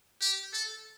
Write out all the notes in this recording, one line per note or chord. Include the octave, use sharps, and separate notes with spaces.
G4
A4